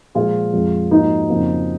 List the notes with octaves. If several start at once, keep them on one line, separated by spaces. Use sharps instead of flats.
A#2 F3 G#3 F4 G#4
F2 F3 G#3
G#2 F3 A#3 D#4 F#4
F2 C#3 F3 A#3